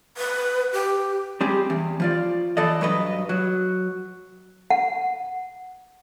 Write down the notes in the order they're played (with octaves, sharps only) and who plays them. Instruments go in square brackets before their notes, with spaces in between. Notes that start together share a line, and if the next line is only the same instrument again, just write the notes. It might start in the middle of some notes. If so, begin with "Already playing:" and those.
[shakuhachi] B4
G4
[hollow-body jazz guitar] G3 C4 G4 G#4
E2
F3 F4 D5
E3 A4 D5 D#5
G2 F#3 B4 D#5
F#3
[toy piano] F#5